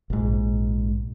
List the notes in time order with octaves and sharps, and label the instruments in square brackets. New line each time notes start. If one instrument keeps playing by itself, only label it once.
[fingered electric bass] A#1 G#2